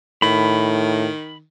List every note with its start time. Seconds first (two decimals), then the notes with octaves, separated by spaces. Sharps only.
0.22 A2 D#3 B5